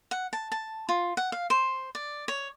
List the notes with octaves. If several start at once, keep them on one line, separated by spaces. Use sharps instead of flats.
F#5
A5
A5
F4
F#5
F5
C5
D5
C#5